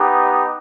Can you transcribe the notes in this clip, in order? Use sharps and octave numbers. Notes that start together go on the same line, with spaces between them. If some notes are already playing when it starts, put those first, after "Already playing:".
Already playing: B3 D#4 G4